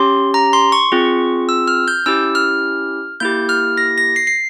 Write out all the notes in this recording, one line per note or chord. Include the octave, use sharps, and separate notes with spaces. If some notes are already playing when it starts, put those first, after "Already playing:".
Already playing: C#4 G4 C6
A#5
C6
C#6
C4 F4 G#4
E6
F6
G6
C#4 E4 G4 E6
F6
A#3 E4 G4 G6
F6
A#6
A#6
C7
C7